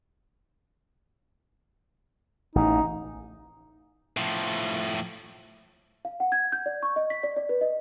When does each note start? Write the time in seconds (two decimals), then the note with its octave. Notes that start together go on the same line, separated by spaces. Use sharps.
2.56 A1 D#4
4.17 A2 F3
6.05 F5
6.20 F#5
6.32 G#6
6.52 G6
6.66 D5
6.83 C#6
6.96 D#5
7.10 B6
7.23 D5
7.37 D5
7.49 B4
7.61 D#5